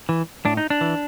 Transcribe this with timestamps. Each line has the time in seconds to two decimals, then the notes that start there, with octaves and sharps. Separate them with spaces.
0.09 E3
0.45 A2 D4
0.57 D#4
0.70 D4
0.81 E3